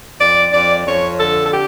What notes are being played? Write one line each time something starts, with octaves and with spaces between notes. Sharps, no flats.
F2 D5
F2 D5
F2 C#5
D3 A4
A4
G4